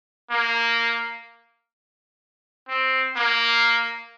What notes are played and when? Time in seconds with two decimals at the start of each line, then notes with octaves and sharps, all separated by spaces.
0.31 A#3
2.69 C4
3.16 A#3